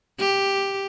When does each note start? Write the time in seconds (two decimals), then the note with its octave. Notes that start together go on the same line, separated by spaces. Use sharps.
0.20 G4